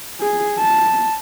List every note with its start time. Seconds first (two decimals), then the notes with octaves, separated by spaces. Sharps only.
0.20 G#4
0.59 A5